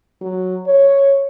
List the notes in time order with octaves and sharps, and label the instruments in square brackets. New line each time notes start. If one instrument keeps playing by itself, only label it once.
[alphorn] F#3
C#5